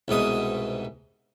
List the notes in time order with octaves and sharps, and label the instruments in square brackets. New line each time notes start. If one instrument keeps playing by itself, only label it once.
[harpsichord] C2 G#2 B2 D#6